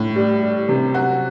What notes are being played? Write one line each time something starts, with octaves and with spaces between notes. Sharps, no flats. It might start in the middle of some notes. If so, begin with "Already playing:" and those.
Already playing: A2
G3
G3
C3
F#3 F#4